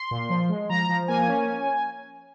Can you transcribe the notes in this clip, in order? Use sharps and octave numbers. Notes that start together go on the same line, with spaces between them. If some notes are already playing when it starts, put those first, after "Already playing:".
Already playing: C6
A#2
F3
G#3
F3 A#5
F3
A#3 G#5
C#4